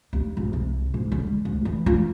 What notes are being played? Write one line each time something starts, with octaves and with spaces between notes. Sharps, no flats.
D#2
G#1
C2
G#2
D3
G#3
D2
E3
F4